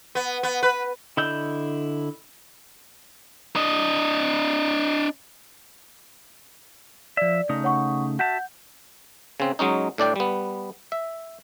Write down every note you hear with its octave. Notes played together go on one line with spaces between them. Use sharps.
B3
B3
B4
D3 E4 D#5 E6 G6
D4 D#5
F3 D5 E5
C#3 A3 D#4
C#5 F#5 C#6
F#4 E5 F#5 A5 G6
C#3 C4
F#3 G#3 C#4 D#4
A2 D4 D5 G5
G3 B3
E5